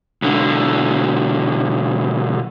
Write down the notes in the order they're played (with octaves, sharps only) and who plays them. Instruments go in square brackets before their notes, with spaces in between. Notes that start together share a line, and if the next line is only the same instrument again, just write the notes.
[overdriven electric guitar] B1 D3